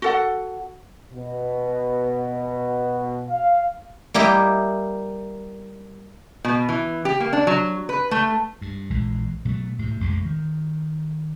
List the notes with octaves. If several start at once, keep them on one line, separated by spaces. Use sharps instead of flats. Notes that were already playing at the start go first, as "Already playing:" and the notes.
F#4 A4 F#5
B2
F5
G3 A#3 E4 G4 D#5
B2
E3
G4
A#3
D4
F#3
B4
A3
G2
A#1 E3 G#3
B2 F#3 G#3 A3
A2 C3
A1 F2 C3 G#3
D#3